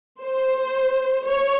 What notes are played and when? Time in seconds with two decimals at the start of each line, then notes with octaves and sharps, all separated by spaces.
0.22 C5
1.26 C#5